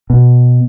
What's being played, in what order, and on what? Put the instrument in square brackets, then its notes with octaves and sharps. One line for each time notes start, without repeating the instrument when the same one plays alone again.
[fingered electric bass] B2